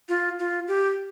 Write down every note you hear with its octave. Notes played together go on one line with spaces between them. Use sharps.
F4
F4
G4